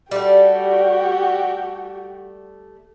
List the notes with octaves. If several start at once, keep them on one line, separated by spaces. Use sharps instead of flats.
G3 A3 F#4 G4